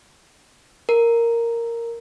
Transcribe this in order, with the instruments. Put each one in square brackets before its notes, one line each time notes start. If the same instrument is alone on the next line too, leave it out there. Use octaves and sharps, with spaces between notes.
[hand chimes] A#4